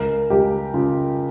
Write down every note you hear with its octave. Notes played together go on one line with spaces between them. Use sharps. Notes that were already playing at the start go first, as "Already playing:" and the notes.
Already playing: C#2 A#4
C#2 G4
C#3 F4